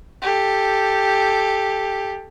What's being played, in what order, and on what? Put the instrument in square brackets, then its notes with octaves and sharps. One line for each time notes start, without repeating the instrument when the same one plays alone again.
[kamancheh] G4 A4